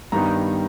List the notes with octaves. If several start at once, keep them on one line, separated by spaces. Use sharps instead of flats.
G2 D#3 G3 B3 D#4 A#5